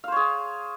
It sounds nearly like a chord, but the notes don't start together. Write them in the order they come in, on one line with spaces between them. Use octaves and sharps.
F5 C5 C#5 G#4